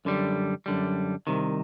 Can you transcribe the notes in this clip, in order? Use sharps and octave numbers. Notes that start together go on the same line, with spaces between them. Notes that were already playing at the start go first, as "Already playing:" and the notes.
F#2 D3 G3
F#2 D3 G3
C2 C3 D#3